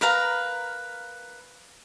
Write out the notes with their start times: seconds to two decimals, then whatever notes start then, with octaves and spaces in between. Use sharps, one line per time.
0.01 A#4 B4 F5 A#5